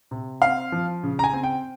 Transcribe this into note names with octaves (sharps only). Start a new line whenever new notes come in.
C3
C4 F5
F3
C#3
A#5
G#5
C4
G5